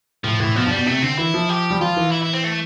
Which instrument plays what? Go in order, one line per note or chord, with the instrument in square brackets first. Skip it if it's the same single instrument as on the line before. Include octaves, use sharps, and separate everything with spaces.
[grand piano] A2 [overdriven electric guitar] F3
[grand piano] A2 [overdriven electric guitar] E3
[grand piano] B2 [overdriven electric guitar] F3
[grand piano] G2
[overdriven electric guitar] G3
[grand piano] B2
[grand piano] C3 [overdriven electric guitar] A3
[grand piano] D3 [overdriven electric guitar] C4
[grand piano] E3 [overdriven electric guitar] E4
[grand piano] F3
[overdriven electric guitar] G4
[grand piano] G3
[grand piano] F3 [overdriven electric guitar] F4
[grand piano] E3
[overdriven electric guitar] E4
E4
C4
A3